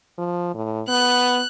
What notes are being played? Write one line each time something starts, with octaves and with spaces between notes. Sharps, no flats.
F3
A2
B3 F#6